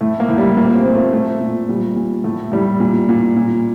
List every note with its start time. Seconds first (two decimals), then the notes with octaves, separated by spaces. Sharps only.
0.01 A2 A3
0.20 A#3
0.29 A2
0.38 G3
0.56 A#2 A#3
0.75 C4
0.85 A#2
0.94 A3
1.12 A#2 A3
1.41 A#2
1.69 A#2 G3
1.96 A#2
2.24 A2 A3
2.52 A2 G3
2.80 A#2
3.09 A#2
3.36 A#2